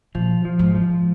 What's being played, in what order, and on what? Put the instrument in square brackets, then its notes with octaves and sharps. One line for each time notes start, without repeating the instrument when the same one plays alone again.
[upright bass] A#2 [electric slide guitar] F3
[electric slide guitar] F3
[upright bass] G#2
[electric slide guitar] F3